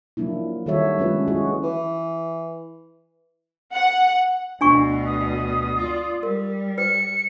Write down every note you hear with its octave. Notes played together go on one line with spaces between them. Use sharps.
F3 F#3 A#3 D4 E4
D#3 G3 F#4 A4 C#5 E5
F#3 G#3 C#4 D4 F4 B4
E4 F#4 G#4
E3
F#5
D2 B2 D4 G#5 C#6
D#6
F4 D5
G3 A#4
B4 C#7